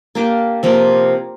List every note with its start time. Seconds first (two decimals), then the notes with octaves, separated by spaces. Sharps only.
0.15 A#3 D4 G4
0.63 C3 F3 A#3 F4